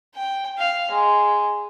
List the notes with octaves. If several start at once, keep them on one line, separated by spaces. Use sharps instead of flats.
G5
F5
G#3